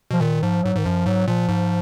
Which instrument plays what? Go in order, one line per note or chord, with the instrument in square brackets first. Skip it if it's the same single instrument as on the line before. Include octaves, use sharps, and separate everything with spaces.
[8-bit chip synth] B2 [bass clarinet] F3
[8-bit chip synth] A#2 [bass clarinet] D#3
[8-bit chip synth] G#2 [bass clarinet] F3
[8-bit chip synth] G#2 [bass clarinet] F#3
[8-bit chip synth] G#2 [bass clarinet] D#3
[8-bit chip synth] F#2 [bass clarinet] F3
[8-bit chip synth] G#2 [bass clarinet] F#3
[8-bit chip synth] A#2 [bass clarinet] F3
[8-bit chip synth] G#2